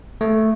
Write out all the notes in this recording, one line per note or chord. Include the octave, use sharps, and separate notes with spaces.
A3